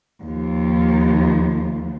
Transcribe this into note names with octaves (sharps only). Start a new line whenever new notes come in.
D#2 F3